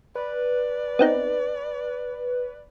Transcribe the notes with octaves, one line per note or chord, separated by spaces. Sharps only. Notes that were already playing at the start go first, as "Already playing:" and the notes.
B4 D5
B3 C4 D#4